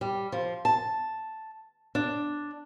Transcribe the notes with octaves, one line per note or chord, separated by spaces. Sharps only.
G3
F3
A5
D4